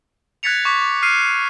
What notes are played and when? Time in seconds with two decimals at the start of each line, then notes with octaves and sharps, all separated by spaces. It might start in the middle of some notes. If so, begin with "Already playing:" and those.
0.43 F#6 G#6 A6 B6 C#7 F7
0.65 C#6 D6 B6
0.82 D6
1.03 F6 C7 D#7